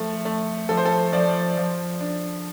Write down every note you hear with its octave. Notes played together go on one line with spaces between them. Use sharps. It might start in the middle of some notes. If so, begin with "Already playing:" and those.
Already playing: F3 A3
A3
F3 A4
C5
A4
F3 D5
F3
D4